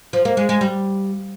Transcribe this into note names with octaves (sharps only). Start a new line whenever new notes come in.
F3
A#3
G#3
G#3
G3